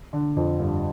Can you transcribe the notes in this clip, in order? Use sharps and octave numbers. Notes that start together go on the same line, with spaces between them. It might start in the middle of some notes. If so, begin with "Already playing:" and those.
D3
F2
G2